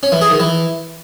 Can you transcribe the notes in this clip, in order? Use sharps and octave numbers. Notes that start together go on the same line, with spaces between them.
C#4
E3
G#4
D#3
E3